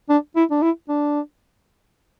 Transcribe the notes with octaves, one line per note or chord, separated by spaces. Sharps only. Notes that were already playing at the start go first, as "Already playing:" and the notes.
D4
E4
D4
E4
D4